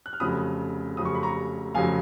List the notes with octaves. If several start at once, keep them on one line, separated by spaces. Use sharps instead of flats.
F#6
F6
F1 F2 C#3 F#3 B5 D#6
F1 F2 C#3 F#3 D#6
C#6
B5
A#5 C#6
F1 F2 C#3 F#3 F5 G#5